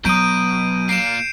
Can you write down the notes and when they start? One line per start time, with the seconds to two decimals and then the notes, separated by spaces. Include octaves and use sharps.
0.05 B2 F#3 A#5 D#6 G6 D7 D#7
0.89 A#3 F4 C7 D7 E7